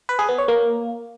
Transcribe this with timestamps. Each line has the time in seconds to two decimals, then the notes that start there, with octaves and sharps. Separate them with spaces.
0.09 B4
0.19 G#4
0.29 B3
0.38 C#5
0.48 A#3